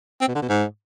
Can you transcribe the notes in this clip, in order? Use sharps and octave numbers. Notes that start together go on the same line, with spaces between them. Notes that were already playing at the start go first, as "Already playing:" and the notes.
C4
B2
D3
B2
G#2